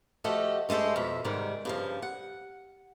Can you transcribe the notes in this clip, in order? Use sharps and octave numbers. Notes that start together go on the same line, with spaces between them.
F3 A3 F#4 G4 A4 D#5
G2 G#3 A3 A4 C5
F2 B2 E5
G#2 C3 D#3 G3
G2 C#3 F3
F#5